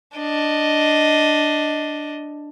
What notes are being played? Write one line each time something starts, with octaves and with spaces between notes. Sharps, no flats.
D4 D#5